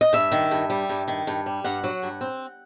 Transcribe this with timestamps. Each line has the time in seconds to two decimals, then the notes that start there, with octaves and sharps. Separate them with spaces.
0.01 D#5
0.13 G2 E5
0.32 D#3
0.51 G2
0.70 G3
0.89 G2
1.08 D#3
1.27 G2
1.46 G3
1.64 G2 F#5
1.84 F#3
2.03 G2
2.21 C4